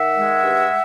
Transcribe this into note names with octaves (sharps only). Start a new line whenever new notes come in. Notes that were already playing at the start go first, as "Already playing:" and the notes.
Already playing: D#3 E5 F#5
G#3
G2